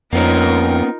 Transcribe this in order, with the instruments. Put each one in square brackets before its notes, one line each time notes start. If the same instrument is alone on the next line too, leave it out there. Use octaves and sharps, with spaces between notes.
[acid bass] F2 [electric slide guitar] A#3 B3 C#4 [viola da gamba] D#4 F4 A#4